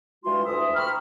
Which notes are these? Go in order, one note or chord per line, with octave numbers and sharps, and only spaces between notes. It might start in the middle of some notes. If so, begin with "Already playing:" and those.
G2 E3 G#3 F4 F#4 C6
D2 E3 E5 D#6
G5 A#5 B5 C#6 F6